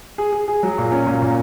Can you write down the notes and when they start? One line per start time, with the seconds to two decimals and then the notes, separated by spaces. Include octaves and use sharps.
0.18 G#4
0.33 G#4
0.48 G#4
0.63 F#3
0.78 A#2
0.92 C#4
1.07 A#2
1.22 A#2